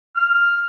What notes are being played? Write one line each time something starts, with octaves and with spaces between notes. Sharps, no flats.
F6